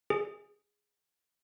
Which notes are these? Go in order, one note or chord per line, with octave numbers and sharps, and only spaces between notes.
G#4